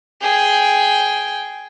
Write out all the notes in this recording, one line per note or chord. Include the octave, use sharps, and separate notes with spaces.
G#4 G5